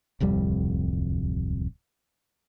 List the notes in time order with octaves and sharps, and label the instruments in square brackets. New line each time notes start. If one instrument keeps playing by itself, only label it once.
[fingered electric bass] D1 C2 F2 G3